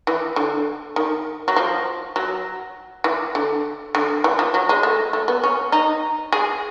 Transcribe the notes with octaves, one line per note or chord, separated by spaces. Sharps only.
E3
D3
D#3
F#3
F3
F#3
E3
D3
D3
E3
F3
F#3
G#3
A3
A3
B3
C#4
D#4
G#4